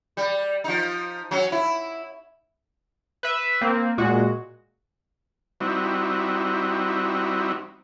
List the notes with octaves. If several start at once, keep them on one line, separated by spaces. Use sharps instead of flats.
G3
F3 D#4
F#3 C#4
E4
B4 E5
A#3 C4
A#2 G#3 F#4
G3 C4 D#4 E4 F#4